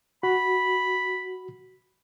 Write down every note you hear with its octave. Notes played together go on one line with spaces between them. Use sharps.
F#4 B5